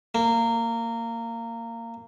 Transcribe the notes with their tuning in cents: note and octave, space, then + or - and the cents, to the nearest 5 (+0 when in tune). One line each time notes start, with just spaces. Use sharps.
A#3 -20